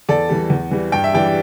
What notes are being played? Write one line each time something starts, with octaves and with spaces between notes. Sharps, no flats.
E2 A4 D5
E3 G3
E2
E3 G3
G2 G5
E5
E3 G3 D4 D5 G5